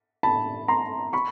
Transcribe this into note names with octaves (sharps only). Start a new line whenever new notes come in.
A5 B5
A#5 C6
B5 C#6